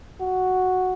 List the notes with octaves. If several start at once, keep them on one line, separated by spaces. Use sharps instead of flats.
F#4